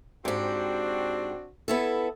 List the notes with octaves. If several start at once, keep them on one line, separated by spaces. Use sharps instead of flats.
G#2 C4 D4 F#4 G4
B3 E4 A4